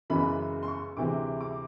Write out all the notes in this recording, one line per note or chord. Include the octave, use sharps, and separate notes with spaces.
F#2 C#3 E3 G#3 B3 B5
C6
C#6
D2 C3 E3 G#3 D6
D6